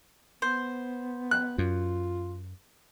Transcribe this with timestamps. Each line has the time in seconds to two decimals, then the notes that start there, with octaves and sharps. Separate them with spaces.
0.42 B3 C5
1.31 F#6
1.58 F#2 F4